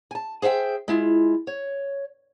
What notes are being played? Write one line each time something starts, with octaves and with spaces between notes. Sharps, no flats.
G#5 A5
G#4 C5 E5 F#5 G5
G#3 E4 F4
C#5